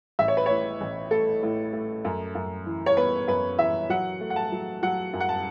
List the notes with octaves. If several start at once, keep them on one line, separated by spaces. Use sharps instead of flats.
A1 E5
C#5
B4
A2 C#5
A1
A3 A4
A2
A3
F#2
F#2
E3
C#5
B3 B4
F#2 B4
E3 E5
F#3 F#5
A3
F#5
A5
F#3
F#3 F#5
F#2
F#5
A5